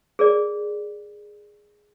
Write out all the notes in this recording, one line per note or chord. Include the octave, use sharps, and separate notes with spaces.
G#4 A#4 D5